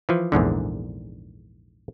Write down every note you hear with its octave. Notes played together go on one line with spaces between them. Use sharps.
E3 F3
A#1 E2 G#2 D3